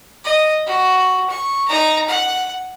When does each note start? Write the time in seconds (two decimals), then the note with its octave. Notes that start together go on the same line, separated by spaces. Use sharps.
0.24 D#5
0.66 F#4
1.29 C#6
1.68 D#4 A#5
2.08 F#5